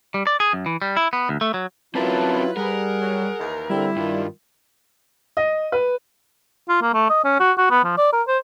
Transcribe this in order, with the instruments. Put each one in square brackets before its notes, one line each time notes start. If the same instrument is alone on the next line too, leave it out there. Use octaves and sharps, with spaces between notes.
[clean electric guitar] G3
D5
G#4
F#2
E3
G3
E4
B3
D2
A3
F#3
[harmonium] F#3 E4 F4 [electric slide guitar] C4 C#4 A#4 [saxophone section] B4 [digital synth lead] A5
[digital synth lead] G3 [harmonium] G#4 F#5 [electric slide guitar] A#4
[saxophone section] F#3
D#2 E3 D#4
[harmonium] D3 C4 [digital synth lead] G3 [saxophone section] E4
[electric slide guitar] G2 [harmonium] D#3 F4
[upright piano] D#5
B4
[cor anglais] F4
A#3
A3
D#5
C#4
F#4
F#4
B3
F3
D5
A#4
C5